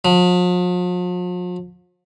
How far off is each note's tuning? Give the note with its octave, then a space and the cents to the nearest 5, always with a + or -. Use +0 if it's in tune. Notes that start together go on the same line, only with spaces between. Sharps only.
F3 +45